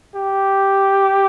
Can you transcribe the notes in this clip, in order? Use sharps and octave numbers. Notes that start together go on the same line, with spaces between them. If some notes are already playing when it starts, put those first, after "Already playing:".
G4